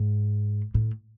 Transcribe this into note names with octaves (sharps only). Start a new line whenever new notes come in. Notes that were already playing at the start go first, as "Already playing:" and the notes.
Already playing: G#2
A2